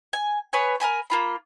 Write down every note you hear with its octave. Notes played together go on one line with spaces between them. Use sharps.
G#5
B3 B4 C#5 G#5
A#4 D#5 G#5 B5
A#3 F4 B5